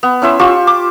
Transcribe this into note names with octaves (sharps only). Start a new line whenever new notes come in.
B3
C#4 E4 C5 E5
F4 G4 C5 C#6
D6